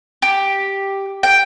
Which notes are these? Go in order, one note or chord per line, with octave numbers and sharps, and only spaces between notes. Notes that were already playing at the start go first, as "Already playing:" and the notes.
G4
G5